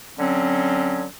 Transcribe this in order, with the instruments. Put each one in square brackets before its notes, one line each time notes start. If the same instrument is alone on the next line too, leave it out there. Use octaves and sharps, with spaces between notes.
[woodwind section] D3 F#3 C4 C#4